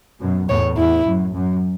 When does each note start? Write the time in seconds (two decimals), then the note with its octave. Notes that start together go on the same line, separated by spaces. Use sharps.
0.21 F#2 B2
0.49 E2 A2 C#5
0.77 E2 E4
1.05 F#2
1.34 F#2